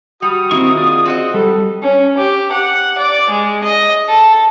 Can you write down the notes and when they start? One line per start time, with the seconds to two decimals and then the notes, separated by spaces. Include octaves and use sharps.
0.22 G3 F#4 D#6
0.51 D#3 A#3 C4 E4 C#6
0.76 F4 G#4 D5
1.05 C4 F#4 D#5
1.34 G3 A4
1.83 C#4
2.18 G4
2.52 F#5
2.98 D5
3.29 G#3
3.64 D#5
4.08 A4